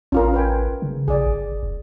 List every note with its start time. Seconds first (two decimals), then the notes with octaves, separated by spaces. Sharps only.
0.12 A1 C#4 F4 A#4
0.34 B4 G5 G#5
0.82 C#3
1.08 A#1 G#4 D5
1.26 G1
1.63 F#1